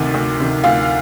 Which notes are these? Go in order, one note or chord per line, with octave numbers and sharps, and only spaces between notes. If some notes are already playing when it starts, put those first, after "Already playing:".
Already playing: D2 C3 D#3
D2
C3 D#3
D2 F4